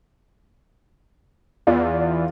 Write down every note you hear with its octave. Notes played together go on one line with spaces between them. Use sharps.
E2 F4 D5